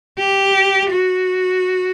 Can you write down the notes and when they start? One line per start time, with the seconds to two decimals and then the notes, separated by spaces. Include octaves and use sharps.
0.18 G4
0.90 F#4